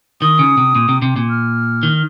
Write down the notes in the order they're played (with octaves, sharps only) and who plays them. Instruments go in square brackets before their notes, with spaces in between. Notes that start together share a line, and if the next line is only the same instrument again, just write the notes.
[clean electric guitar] D#3 [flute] D#6
[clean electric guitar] C#3
C3
A#2
C3
C3
A#2
[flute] F6
[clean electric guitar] D#3